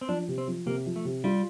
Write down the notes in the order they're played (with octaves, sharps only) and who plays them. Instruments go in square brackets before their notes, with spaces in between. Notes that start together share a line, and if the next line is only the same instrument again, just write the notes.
[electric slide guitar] C4
[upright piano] F3 [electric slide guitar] D4
[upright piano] C3
[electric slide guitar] C4
[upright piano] F3
[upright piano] C3 [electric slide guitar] A#3
[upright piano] F3
[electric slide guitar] A3
[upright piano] C3
[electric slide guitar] G3 [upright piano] F4